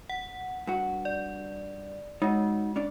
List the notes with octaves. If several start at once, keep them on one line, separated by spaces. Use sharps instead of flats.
F#5
G2 F#4
D5
G#3 D#4 F#4
C#4 D4 D5